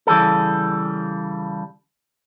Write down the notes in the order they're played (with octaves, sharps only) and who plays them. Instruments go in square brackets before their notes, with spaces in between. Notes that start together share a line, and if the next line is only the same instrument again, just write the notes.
[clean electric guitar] C#3 E3 G3 G#4 A4